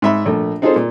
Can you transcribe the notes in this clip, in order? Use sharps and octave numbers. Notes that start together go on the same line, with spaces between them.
G#2 E5 B5
A#1 A3
C4 D#4 F4 G#4 A4 C5
A#2